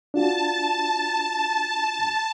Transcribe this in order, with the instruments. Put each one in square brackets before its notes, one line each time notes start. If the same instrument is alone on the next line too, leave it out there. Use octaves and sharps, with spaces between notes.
[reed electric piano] D4 F4 F#4 [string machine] A5